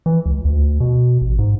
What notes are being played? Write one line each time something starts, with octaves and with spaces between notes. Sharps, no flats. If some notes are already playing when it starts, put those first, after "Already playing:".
E3
C#2
D2
B2
A1
G#2